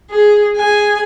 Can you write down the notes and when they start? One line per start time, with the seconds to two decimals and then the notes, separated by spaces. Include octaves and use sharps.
0.11 G#4
0.57 G#4 G#5